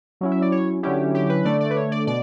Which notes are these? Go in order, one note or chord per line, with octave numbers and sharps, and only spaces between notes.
F#3 C#4 E4
E5
D5
C#5
D3 F#3 C#4 E4 G4
G4
B4
D3 A3 D4 D5
D5
B4
C#5
D5
B2 D5